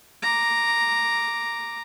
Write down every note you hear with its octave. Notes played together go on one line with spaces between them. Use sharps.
A#5 D6